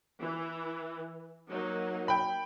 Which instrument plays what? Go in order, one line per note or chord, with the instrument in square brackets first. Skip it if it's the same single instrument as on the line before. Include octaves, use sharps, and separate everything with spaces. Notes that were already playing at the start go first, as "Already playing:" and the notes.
[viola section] E3
F#3 A#3 D#4
[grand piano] G5 B5